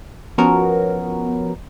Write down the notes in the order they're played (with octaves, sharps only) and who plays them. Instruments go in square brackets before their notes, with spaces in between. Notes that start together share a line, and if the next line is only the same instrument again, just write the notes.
[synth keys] F3 B3 C#4 F#4 A#4